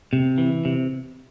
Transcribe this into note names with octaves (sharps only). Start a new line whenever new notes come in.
C3
E3
C3